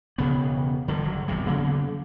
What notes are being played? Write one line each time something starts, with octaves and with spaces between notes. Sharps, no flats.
E1 C#3 B3
D3 D#3 F3 G3
F#1 F#3
G#1 E2 C3 G3
C#3 F#3 A#3 B3